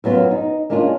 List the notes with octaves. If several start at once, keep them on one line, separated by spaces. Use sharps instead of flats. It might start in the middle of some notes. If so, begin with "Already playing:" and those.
F#2 F#3 B3 F4
D#4
G#3 A#3 C#4 D4 F4